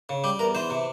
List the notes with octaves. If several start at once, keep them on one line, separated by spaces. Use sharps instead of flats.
C#3
G3 G4
E2 A#4
E3 C5
C3